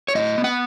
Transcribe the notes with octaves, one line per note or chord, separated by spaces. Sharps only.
C#5
A2 D#5
B3
F#5